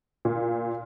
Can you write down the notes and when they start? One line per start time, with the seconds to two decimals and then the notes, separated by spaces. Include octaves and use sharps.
0.25 A#2